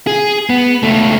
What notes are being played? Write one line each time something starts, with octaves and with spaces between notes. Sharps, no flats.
G#4
B3
C#2 A3